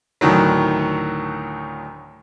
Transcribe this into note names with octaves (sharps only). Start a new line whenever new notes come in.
D2 A2 D#3 F#3